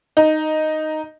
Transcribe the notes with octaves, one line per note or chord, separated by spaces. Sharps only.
D#4